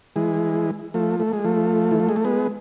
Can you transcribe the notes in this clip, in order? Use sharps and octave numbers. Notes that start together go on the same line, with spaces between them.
E3 G#3
F3 A3
A3
G#3
F3 A3
E3
F3
G#3
A3
G#3 B3